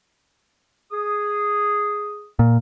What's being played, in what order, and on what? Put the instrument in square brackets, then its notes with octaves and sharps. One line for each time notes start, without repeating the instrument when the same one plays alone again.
[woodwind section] G#4 D#6
[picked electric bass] A#2